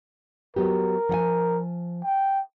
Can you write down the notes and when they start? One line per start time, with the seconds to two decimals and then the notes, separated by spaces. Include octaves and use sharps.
0.56 F#3 B3 G4 A#4
1.09 F3 F#5 G#5
2.04 G5